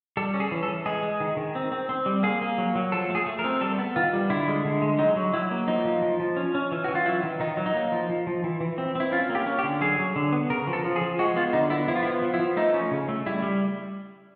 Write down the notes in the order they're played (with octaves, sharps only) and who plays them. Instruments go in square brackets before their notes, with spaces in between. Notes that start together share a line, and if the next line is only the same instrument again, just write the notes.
[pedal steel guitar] G3 A4
C#4
G#4
E3
A4
E3
G#3 G#4
G#3
D#3
D#3
C4
C4
C4
G3
A#3 G#4
A#3
F#3
F#3
F3 A4
A3 G#4
A3
A#4
C4
G3 A4
B3
D#3 F4
G3
D3 E4
G#3
D3
G#3
F#3 D#4
F#3
F#3 E4
A#3
F3 D#4
F3
F3
F3
C#4
C#4
E3
E3 F#4
F4
F#3 E4
D#3
D#3 D#4
F#3
D#4
A#3
F3
F3
F3
E3
E3
C4
C4 E4
C#4 F4
A#3
G4
C#4
G4
D3
F#3 G#4
F#3
D3
B3
C#3 A#4
F3
A4
F3
G#4
F3
G#3 F#4
B3 F4
D3 D#4
B3 E4
F3 E4
F4
B3 E4
F3
E4
F3
A3 D#4
C#4
C#3
A3
G3 E4
G3